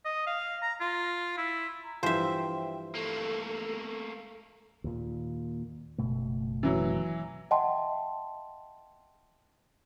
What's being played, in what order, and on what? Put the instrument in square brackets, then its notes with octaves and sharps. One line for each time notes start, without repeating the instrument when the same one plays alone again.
[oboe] D#5
F5
A#5
F4
E4
[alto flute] A#5
[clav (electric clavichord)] G2 E3 F3 [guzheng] C5 E5 [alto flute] G5
[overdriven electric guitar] A3 A#3 [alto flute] A4
[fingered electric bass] D#2 A#2
F#1 B2 A3
[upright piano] E3 F#3
[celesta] D#5 E5 F#5 G5 A5 C6